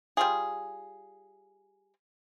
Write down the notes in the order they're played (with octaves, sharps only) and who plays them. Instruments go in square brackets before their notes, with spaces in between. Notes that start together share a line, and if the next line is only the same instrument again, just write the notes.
[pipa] G3 F4 G#4